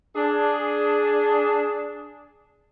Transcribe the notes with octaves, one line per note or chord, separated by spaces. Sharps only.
D4 G#4